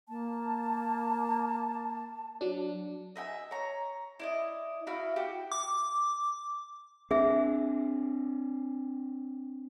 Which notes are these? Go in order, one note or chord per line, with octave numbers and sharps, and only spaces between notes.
A#3 A5
F#3 D4
D#5 E5 G5 G#5
C#5 A#5
E4 D5 D#5
E4 F#4 F5
F#4 G4
D6
C4 D4 G#4 E5